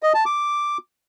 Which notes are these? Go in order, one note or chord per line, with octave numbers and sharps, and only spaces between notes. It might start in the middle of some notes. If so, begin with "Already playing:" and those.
D#5
A5
D6